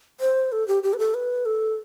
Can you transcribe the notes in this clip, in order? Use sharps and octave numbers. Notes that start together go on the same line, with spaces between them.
C5
A4
G4
G4
B4
A4
B4
A4